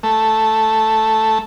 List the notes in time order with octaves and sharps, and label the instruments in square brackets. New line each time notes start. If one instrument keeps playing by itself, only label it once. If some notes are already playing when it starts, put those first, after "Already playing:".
[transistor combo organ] A3